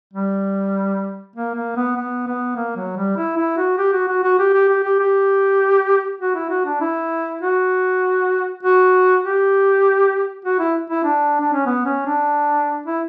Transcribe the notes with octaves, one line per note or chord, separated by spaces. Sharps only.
G3
A#3
A#3
B3
B3
B3
A#3
F#3
G3
E4
E4
F#4
G4
F#4
F#4
F#4
G4
G4
G4
G4
G4
F#4
E4
F#4
D4
E4
F#4
F#4
G4
F#4
E4
E4
D4
D4
C#4
B3
C#4
D4
E4